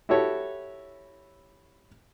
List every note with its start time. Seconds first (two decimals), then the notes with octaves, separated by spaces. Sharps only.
0.09 E4 F#4 G4 A4 C#5